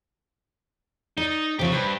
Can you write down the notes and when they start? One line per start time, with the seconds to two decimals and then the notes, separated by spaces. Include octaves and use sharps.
1.17 D#4 D5
1.59 C3 F3 G4 C#5
1.72 G2 B4 C5